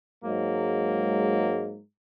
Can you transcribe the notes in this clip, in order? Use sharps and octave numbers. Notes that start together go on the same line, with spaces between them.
G#2 F#3 G#3 A#3